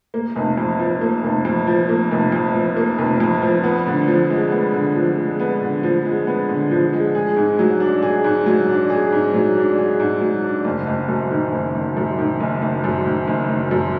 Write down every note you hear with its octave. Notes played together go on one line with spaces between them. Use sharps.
A#3
F1
F2
F3
A#3
F1
F2
F3
A#3
F1
F2
F3
A#3
F1
F2
F3
B3
D3
F3
G#3
B3
D3
F3
G#3
B3
D3
F3
G#3
B3
D3
F3
G#3
G#4
G#2
F#3
D4
G#4
G#2
F#3
D4
G#4
G#2
F#3
D4
G#4
G#2
F#3
D4
F#1
F#1
F#2
D#3
F#1
F#1
F#2
D#3
F#1
F#1
F#2
D#3
F#1
F#1
F#2